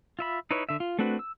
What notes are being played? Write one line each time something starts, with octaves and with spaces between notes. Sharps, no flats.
F4 E5 B5
D#4 E4 B4 C#5
D3 E5
F4
A3 C4 D4 F#4 B4
E6